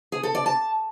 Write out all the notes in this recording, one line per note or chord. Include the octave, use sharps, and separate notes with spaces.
G#4
A4
D5
A5